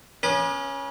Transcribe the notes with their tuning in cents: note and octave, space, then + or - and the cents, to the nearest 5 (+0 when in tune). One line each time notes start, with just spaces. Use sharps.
C#4 +0 B4 -40 D#6 -45